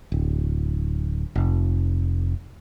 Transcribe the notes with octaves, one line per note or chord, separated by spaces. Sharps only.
D1
F1